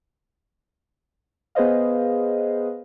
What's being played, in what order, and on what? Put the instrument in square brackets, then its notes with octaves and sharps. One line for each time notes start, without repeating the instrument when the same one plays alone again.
[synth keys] B3 G#4 B4 C5 D#5 F5